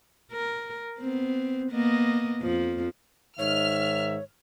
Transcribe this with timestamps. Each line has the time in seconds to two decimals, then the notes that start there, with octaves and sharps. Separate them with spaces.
0.32 A#4
1.00 B3 C4
1.71 A#3 B3 D#5
2.41 F2 F3
3.39 G#2 D#3 C#5 E5 F6